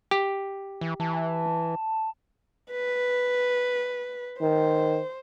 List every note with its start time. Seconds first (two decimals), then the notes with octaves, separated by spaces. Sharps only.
0.11 G4
0.81 E3
1.00 E3 A5
2.72 B4
4.41 D#3 C5